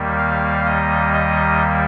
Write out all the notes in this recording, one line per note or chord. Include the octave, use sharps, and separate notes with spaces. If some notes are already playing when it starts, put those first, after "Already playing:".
Already playing: D#2 D#3 G3 A#3
F5
D#5
D#5